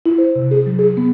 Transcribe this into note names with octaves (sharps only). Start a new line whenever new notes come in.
E4
C5
C3
G#4
F#3
G#4
B3